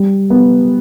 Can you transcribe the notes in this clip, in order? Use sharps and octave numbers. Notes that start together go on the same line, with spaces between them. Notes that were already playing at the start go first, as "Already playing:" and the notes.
Already playing: G3
B3